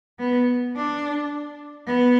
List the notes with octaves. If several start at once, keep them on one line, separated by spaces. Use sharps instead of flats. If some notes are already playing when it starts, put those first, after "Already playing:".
B3
D4
B3